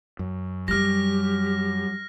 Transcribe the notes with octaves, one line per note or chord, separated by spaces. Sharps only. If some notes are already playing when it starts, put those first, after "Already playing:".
F#2
F#3 G3 G4 F6 A#6